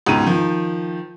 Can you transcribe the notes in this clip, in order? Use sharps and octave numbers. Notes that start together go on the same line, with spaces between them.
C#2 G#2 B2 D#7
D#3 F3